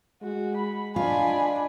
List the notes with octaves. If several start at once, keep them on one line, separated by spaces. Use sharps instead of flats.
G#3 F#4
B5
D4 F4 D#5 G#5 B5